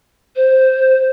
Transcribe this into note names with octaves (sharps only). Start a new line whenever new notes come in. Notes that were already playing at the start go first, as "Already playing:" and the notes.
C5